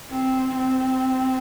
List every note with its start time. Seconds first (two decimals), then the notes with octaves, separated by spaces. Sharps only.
0.11 C4
0.56 C4